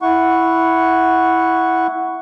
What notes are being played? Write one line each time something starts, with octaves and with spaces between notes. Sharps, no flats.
E4 F#5 C#6